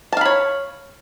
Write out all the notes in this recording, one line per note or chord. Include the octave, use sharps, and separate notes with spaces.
C#5 F5 A5 B5